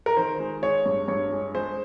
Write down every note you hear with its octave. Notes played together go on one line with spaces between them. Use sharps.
A#4
D#3 C5
G#3
G#3 C#5
G2
G2 C#5
G#3
G#3 C5